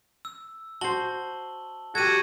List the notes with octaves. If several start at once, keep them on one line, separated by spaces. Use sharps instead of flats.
E6
F#4 C5 A5 F#7 G7
F#4 G4 A4 G#6 D#7